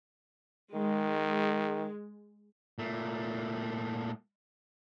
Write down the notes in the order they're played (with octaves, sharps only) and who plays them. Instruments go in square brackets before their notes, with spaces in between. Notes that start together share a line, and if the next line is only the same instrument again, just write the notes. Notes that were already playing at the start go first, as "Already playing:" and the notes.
[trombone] D#3 [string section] G#3
[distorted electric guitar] A#2 A3